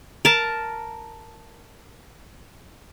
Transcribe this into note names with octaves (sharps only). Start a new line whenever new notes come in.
A#4 A5